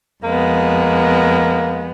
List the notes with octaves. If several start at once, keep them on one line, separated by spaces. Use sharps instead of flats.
F2 G#3 A#3 B3